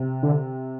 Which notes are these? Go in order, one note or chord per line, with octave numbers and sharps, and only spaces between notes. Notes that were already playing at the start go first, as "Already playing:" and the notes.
Already playing: C3
D3